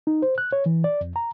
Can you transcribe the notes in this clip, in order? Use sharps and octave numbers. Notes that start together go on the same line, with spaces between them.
D#4
C5
F#6
C#5
E3
D5
F2
A#5